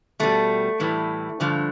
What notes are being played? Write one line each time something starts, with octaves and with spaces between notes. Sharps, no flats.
B2 G3 A3
A2 E3 G3
G2 D3 F3